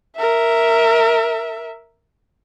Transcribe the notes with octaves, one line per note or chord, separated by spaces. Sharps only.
A#4 E5